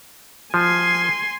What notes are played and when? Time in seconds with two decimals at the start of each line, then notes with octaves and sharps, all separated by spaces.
0.54 F3 G#5 C6